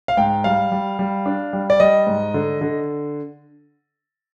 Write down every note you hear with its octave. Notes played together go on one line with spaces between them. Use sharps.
F5
G#2 G5
G3 F5
G3
G3
D4
G3
D5
G3 D#5
G#2
D3
D3